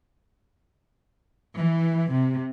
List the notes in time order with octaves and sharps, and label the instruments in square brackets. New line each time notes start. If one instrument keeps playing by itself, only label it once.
[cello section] E3
C3